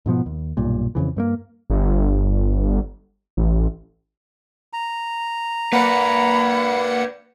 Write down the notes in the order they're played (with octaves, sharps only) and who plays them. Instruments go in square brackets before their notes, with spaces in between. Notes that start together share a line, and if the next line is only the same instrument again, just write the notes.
[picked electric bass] G#2 B2 F3 B3
D#2
B1 G2 A#2
F2 C#3 E3
G2 A3 A#3
[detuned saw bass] G1
A1
[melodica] A#5
[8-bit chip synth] A#3 F#5 C#7 [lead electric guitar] B4 D5 [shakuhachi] B5